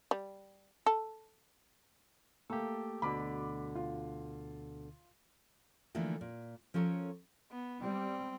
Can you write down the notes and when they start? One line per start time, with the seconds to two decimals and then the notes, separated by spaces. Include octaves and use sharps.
0.11 G3
0.86 A4
2.50 A3 A#3 G4 A4
3.02 D2 B2 D3 B5 D6
3.75 F4
5.95 D3 E3 F3 A3 A#3
6.21 A#2
6.74 F3 C#4 A4 A#4 C#5
7.52 B3
7.82 G3 C4